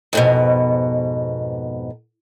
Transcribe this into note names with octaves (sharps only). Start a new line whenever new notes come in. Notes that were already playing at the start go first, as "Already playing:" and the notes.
F2 G#2 B2